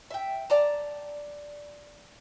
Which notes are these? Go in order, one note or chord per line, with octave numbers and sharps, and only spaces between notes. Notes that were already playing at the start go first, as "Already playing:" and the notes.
E5 G5
D5 A5 A#5